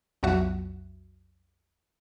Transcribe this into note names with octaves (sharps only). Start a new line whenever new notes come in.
B1 F2 F#3 F#4 E5